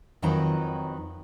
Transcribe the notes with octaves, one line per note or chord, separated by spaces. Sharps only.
F2 D#3 F#3 C4 B4 A#5